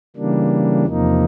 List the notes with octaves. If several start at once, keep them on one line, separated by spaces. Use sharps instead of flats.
C#3 E3 G3 A#3 D4
E2 C3 F3 A#3 D#4